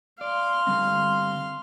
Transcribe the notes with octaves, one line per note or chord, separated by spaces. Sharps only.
D5 F5 C6
D3 G3 C4